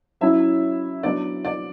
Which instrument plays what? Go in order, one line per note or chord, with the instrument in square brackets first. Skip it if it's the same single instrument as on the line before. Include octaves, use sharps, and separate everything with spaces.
[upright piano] F#3 C#4 E4 E5
F#3 B3 D4 D5
D5